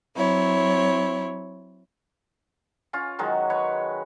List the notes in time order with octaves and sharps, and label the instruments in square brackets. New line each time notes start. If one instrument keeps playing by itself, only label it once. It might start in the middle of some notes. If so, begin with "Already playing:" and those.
[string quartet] F#3 C4 E4 C#5
[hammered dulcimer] C#4 F4
D#3 F#3 G#3
B4 C#5